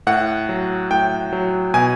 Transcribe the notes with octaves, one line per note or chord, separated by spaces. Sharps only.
A2 F#5
F#3
A2 G5
F#3
B2 G#5